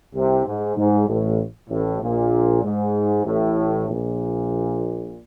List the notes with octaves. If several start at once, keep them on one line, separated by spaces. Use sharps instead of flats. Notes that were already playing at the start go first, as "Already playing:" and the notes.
C2 C3
G#2
G#2
A1 A2
A1 A2
A#1 A#2
G#2
A1 A2
A#1 A#2